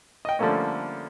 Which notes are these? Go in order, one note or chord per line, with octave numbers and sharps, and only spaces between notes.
D#5 G5
D3 F3 G3 A3 A#3 C#4